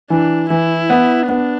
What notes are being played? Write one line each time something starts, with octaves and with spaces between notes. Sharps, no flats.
E3 D4
E3 E4
B3
B3 D4